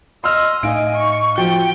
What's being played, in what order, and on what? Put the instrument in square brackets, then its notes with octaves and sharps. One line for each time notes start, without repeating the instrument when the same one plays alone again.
[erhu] D#5 [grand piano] C6 E6 F6
[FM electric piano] A2 D#4 F5 [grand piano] D#5 D7 [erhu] G#5
[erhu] C#6
[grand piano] F3 [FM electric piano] F#4 [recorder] G5 [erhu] G6